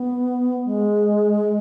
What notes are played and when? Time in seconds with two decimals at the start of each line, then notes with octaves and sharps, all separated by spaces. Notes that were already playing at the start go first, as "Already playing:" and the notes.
Already playing: B3
0.65 G#3